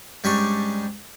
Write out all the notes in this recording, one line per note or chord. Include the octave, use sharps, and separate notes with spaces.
G#2 G3 C#4 D4 G4 C#6